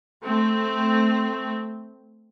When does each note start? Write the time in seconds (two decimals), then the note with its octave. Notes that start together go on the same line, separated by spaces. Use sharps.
0.22 A3 C4